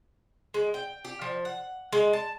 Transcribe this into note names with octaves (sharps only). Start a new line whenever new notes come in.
G#3
G5
G4
F3
F#5
G#3
A5